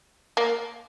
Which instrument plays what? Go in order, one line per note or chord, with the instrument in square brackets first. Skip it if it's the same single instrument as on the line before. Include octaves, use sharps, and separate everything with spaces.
[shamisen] A#3